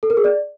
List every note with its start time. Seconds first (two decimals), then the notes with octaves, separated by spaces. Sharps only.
0.03 A4
0.10 A#4
0.17 G#4
0.24 D5